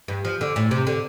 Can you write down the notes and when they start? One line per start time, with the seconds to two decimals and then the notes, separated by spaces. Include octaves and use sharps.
0.08 G2
0.25 F3
0.41 D3
0.56 A2
0.71 C3
0.87 D3